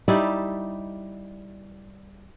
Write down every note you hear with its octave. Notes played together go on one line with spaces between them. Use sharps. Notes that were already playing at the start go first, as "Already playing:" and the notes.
G3 D#4 E4 D5